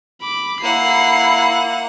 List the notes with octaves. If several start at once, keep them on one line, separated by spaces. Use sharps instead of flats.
B5 D6
A#3 E4 F#5 C7